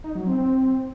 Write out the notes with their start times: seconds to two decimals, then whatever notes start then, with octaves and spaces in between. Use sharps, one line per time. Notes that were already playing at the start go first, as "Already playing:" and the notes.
0.04 D#4
0.15 F#3
0.27 C4